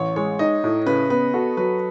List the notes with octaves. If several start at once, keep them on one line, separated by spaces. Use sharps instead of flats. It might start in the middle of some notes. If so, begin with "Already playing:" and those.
Already playing: A1 C#5
G#3 C#5
D#4 D#5
A2
C#3 B4
B3 B4
F#4 A4
F#3 B4